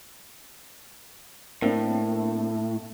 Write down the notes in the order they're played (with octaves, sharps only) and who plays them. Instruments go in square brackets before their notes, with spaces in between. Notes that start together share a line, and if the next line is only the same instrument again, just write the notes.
[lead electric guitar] A2 [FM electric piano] A#3 C4 D4